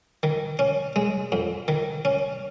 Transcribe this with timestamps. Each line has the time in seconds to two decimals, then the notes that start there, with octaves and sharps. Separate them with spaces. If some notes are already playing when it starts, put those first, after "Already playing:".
0.23 D#3
0.59 C#4
0.96 G#3
1.32 F2
1.68 D#3
2.05 C#4